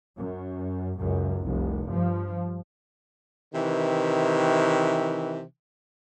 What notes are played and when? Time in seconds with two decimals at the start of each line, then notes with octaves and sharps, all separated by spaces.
0.17 F#2
0.97 C#2 F#2
1.42 F1 C2
1.88 G2 F3
3.54 C3 D#3 E3